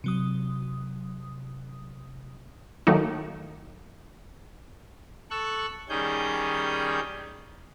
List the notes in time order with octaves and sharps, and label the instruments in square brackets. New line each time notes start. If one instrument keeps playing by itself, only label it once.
[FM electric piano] C3 F#3 D#6
[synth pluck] D#3 F#3 A3 A#3 D#4
[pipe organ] A4 C#6 E6 F#6
D#3 G3 C#4 G#4 G6